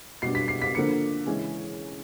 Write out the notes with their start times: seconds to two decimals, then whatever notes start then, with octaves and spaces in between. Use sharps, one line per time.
0.22 B2 G3 B3 D4 C7
0.35 B6
0.48 C7
0.62 B6
0.74 D3 F3 A#3 D4 C#7
1.26 C#3 E3 G#3 C#4